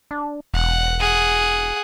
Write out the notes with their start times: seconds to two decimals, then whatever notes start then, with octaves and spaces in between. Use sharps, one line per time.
0.11 D4
0.54 E1 F#5
1.00 G#4 F#5